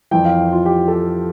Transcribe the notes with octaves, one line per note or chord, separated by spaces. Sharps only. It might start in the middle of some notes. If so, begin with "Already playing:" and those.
F2 E3 G5
F5
F4
G4
A4
G4